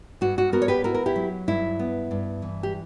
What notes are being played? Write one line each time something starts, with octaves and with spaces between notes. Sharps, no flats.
G2 F#4
F#4
B3 F#4 A#4
C#5
G4 B4
E4 F#4 A#4
A#4
E4 G4
F#3
G2 E4
B3
G2
E3
G4